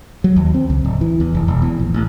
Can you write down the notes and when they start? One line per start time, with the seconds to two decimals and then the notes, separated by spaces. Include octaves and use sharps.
0.24 F#3
0.36 D#2
0.54 C4
0.70 C#2
0.85 D1
1.01 E3
1.20 E2
1.35 F1
1.48 E1
1.62 E2
1.79 A#1
1.94 A1